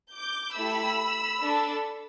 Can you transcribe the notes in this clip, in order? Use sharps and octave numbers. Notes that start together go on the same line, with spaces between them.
D6 G6
A3 E4 G4 B5 E6
D4 A4